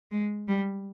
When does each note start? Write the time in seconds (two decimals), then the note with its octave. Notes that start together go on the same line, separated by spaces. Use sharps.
0.11 G#3
0.48 G3